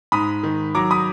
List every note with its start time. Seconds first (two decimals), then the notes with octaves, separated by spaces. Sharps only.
0.12 G#2 B5 D#6
0.43 D#3
0.75 F#3 A#5 D6
0.91 B5 D#6